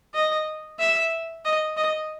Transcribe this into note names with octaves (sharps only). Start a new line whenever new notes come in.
D#5
E5
D#5
D#5